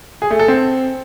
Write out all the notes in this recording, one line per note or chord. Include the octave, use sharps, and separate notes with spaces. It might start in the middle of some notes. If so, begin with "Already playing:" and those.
G#4
A3
A4
C4